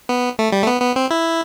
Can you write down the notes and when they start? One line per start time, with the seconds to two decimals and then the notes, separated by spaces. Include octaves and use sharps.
0.09 B3
0.39 A3
0.52 G3
0.63 A3
0.67 B3
0.82 B3
0.96 C4
1.10 E4